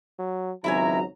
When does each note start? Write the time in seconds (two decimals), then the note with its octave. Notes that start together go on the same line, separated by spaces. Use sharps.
0.19 F#3
0.64 G#1 C#2 F#3 E4 E5 G#5 A#5